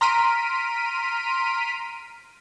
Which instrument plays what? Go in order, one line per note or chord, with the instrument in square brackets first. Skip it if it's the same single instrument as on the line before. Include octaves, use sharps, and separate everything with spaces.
[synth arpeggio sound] A#5 C6 F6 B6 D7 D#7